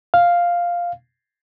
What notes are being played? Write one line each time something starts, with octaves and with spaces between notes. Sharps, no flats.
F5